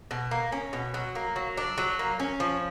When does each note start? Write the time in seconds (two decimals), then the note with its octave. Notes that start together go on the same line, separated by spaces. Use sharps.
0.11 B2
0.31 A#3
0.52 C#4
0.73 B2
0.94 F#3
1.15 A#3
1.36 F#3
1.58 D4
1.78 F#3
1.99 A#3
2.20 C#4
2.40 F3